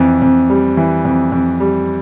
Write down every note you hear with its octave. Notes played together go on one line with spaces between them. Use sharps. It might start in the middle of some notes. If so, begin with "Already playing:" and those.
Already playing: F2 E3
F2
G3
E3
F2
F2
G3